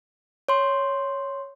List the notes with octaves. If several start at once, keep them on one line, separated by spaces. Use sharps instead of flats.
C#5 C6